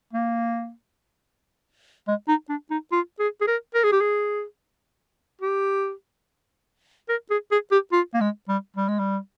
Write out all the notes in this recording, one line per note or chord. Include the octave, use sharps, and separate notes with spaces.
A#3
G#3
D#4
D4
D#4
F4
G#4
G#4
A#4
A#4
G#4
G4
G#4
G4
A#4
G#4
G#4
G4
F4
A#3
G#3
G3
G3
G#3
G3